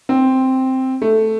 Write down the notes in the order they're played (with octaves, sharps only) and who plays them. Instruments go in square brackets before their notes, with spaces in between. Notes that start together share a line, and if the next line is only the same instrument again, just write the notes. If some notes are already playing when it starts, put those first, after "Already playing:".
[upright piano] C4
A3